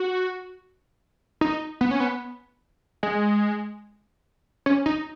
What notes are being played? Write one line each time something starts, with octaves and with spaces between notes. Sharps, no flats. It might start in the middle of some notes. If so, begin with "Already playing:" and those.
Already playing: F#4
D#4
B3
C#4
B3
G#3
C#4
D#4